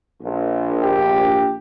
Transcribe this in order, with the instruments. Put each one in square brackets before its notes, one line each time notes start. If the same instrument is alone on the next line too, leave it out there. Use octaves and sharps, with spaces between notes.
[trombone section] A#1
[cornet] G4